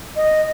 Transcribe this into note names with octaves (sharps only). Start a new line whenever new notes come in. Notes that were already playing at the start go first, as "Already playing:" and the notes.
D#5